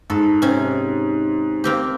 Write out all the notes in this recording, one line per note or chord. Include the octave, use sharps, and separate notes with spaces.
G#2 A4
C3 C#4
A#3 C4 G4